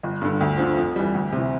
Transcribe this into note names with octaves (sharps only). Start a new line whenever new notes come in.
G1
G2 D3
D2
D3 F3
F2
E3 G3
D2
C3
E3